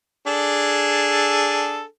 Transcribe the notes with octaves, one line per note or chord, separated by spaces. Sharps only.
D4 G#4 A4